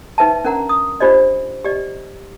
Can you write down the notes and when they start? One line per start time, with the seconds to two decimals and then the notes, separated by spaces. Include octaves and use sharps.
0.18 D#4 B4 E5 A5
0.45 C#4 D4 A#4 F#5 A#5
0.69 D#6
1.00 D4 F4 G4 C5 D5 D#5
1.64 G4 D5 D#5